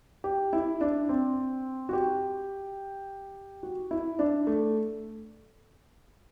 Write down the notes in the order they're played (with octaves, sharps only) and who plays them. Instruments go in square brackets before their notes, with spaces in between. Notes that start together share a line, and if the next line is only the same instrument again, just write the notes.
[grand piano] G4
E4
D4
C4
F#4
G4
F#4
E4
D4
A3